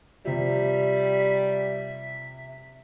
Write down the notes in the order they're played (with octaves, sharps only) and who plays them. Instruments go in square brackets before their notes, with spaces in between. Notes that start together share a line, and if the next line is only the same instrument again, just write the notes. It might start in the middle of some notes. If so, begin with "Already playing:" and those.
[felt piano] C3 F3 [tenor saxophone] G3 [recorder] E5